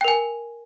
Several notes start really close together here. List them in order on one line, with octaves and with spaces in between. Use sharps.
G5 A#4 G#5